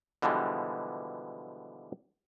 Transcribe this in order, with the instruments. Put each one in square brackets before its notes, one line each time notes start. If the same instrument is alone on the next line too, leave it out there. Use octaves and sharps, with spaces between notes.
[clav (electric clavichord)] B2 D3 E3 F3 G3 G#3